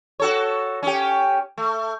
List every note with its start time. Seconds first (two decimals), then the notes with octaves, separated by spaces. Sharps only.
0.20 F#4 A4 C#5
0.83 C#4 G4
1.58 A3